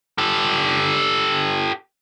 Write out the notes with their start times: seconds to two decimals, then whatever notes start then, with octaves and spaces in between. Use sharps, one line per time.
0.18 G4 A4